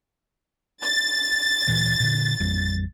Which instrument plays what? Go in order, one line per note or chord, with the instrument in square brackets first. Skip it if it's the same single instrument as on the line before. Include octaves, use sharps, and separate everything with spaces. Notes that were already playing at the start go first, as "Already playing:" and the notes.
[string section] A6
[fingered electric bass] D1 A#2 E3
A#2 D3
A1 F2 G3